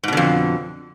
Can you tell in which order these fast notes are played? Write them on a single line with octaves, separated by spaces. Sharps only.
G#2 B2 D3 F2